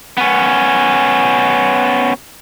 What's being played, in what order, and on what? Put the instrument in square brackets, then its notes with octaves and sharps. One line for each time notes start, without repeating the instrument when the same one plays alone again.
[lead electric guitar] B3 C#4